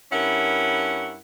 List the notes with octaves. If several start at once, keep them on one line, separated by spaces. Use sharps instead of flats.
G2 C#4 E4 A#4 F#5